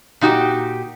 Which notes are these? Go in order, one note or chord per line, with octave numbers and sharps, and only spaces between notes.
A#2 D#4 F#4 G4